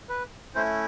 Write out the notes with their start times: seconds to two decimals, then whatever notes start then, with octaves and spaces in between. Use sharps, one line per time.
0.09 B4
0.55 A3 C#4 E4 C5